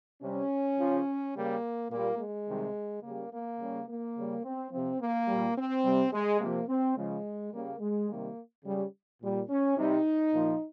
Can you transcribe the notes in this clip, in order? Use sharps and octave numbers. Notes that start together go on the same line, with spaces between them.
C3 G3 C#4
C#3 F3
C#3 G3 A#3
A#2 G3 A#3
G#3
C3 D#3 G3
C#3 A#3
G3
A#3
C#3 G3
A#3
C#3 G3
C4
C3 F3 C4
A#3
A#2 G3
C4
C3 G3
G#3
C3 F3 A#3
C4
C#3 F3 G#3
C#3 G3 A#3
G#3
C3 D#3 G3 A#3
C#3 G3
A#2 G3
C#4
C3 G3 D#4
A#2 F3